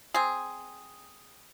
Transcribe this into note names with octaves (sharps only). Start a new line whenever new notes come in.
C4 G#4